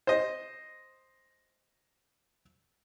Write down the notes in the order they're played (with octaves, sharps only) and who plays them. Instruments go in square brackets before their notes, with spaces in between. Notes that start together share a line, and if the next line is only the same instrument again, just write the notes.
[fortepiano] C5 D#5